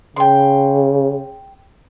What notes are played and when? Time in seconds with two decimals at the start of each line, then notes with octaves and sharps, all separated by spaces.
0.16 C#3 G5 C6